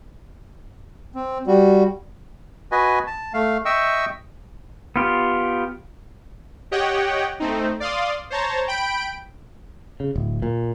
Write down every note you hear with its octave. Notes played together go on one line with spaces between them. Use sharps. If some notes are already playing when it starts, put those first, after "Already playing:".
C4
G3 F#4
F#4 B4 D#5 G#5
A5
A3 F5
D#5 E5 G5 C#6 E6
B3 F4 G4
G4 C#5 D#5 F#5 G5
A3 C4 D#4
D5 F5 C6 D#6
C5 C#5 A5 A#5
G5 B5 D7
C#3
D1
A#2